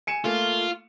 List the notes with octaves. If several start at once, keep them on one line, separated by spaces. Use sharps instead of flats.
G#5 C#7 E7
A3 A#3 F4